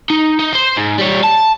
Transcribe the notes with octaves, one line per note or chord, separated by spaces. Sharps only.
D#4
D#4
C5 C6
G#2
G3 C#5
A5